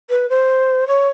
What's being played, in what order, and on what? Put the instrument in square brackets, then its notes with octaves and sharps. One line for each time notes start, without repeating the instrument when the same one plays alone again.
[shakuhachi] B4
C5
C#5